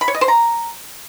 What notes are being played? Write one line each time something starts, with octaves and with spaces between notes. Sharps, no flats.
B5
C#5
D#5
C5
A#5